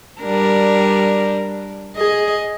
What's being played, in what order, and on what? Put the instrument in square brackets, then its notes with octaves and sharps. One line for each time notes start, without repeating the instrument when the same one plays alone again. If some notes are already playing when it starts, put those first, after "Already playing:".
[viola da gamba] G3 D4 A#4
[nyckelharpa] G#4 [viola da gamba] D#5